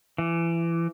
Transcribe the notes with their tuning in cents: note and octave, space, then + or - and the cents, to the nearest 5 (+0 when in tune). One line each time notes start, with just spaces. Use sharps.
E3 +25